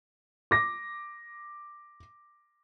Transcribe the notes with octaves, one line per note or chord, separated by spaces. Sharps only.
D6 A#6